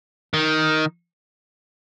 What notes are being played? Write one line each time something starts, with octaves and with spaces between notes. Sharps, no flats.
D#3